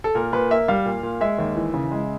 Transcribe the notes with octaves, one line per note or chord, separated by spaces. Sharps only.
A4
A#2 A#4
A#2 B4
A#3 E5
G3 F5
A#2
A#2
G#3 E5
D#2
E3
C#3
G#3